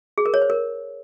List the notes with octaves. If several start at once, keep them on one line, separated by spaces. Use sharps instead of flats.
G#4
A#4
C#5
C5
A#4